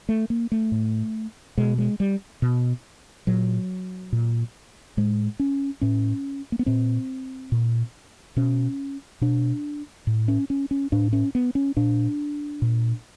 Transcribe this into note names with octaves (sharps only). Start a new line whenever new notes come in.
A3
A#3
A3
A2
B2 G#3
G#3
G3
B2
A#2 F#3
A#2
A2 G#3
C#4
A2 C#4
A#3
B3
A#2 C4
A#2
B2 C#4
B2 D4
A2
C#4
C#4
C#4
A2 D4
C#4
B3
C#4
A#2 D4
A#2